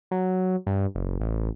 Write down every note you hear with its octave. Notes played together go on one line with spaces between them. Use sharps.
F#3
G2
F#1
A1